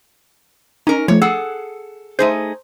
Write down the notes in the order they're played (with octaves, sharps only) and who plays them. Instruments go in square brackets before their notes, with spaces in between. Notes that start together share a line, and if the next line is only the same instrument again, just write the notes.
[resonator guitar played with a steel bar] C#4 A#4 [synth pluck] D#4
[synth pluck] F3 A3 [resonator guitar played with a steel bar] C#5
[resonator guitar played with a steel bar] G#4 A4 F#5 [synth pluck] E6
[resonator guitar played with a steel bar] A3 D#4 G#4 [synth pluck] C5